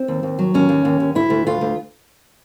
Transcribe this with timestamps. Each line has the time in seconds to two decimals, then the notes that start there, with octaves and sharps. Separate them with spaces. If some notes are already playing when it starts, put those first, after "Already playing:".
Already playing: C4
0.08 D#2
0.23 D#2
0.39 F#3
0.54 D#2 C#4
0.69 D#2
0.85 D#2
1.00 D#2
1.15 D2 E4
1.30 D2
1.46 D2 F4
1.61 D2